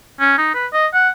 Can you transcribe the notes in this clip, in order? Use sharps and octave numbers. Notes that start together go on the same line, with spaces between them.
C#4
D#4
B4
D#5
F#5